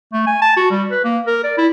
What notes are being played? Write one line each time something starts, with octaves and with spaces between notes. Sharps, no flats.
A3
G#5
A5
F#4
G3
B4
A#3
A#4
D5
E4